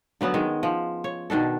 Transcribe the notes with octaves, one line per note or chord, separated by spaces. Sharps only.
D3 F#3 B3 C#4
D#3 G#3
F3
C#5
B2 D#3 D4 A4